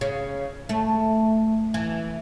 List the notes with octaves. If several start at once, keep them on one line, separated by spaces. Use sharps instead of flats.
C#3
A3
E3